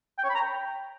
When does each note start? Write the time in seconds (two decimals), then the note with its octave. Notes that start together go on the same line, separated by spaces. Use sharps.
0.19 G5
0.24 C#5
0.30 B5
0.35 A#5
0.41 G5